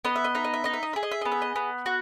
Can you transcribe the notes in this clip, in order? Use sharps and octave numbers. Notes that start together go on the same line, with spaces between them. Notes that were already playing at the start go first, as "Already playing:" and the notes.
B3 D#5
E5
D#5
D#4 E5
D#5
E5
D#4 D#5
E5
D#5
G#4 E5
D#5
E5
B3 D#5
E5
D#5
B3
F#4